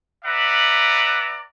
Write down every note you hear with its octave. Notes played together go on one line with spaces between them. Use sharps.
B4 D5 E5 F#5 A#5